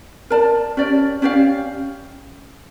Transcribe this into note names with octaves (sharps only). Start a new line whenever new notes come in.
A#4 D5 A5
C#4 G4 D5
C#4 G4 D5 F5